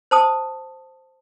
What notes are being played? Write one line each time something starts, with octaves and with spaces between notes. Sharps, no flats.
C5 A5 D#6